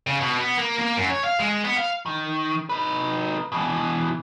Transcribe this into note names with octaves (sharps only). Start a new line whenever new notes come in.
C#3
B2
B3
A#3
A#3
F#2
C#5
F5
G#3
B3
F5
D#3
D#4 B4
B2 E3